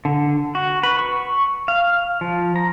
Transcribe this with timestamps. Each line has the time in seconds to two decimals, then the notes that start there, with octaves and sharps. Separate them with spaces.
0.05 D3
0.55 F#4
0.83 B4
0.99 C#6
1.68 F5
2.21 F3
2.56 A#5